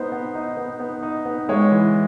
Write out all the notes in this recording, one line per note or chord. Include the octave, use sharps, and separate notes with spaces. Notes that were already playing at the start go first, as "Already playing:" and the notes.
Already playing: B3 D#4 C5
B3
D#4
B3
B3
D#4
B3
G#3 C#5
E3